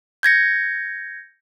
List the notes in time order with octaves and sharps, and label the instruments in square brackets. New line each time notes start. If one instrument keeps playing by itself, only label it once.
[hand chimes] G6 G#6 A#6 C#7